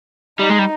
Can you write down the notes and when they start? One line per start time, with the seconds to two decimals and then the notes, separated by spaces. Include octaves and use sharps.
0.39 G3 D#4
0.49 G#3
0.59 G3